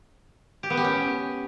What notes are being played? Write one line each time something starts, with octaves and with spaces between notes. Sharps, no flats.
G4
B3
G4
C#4